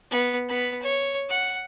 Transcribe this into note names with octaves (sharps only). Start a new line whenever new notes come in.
B3
B3 B5
C#5
F#5